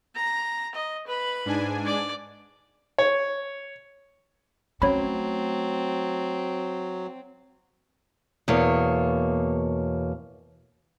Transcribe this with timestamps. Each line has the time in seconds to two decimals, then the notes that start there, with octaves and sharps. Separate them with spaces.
0.15 A#5
0.75 D#5
1.07 B4 B5
1.46 G#2 D4 G#5
1.85 D5
2.99 C#5
4.82 F#3 A3 C4 C#4 C#5 B5
8.48 E2 B2 A#3 C#5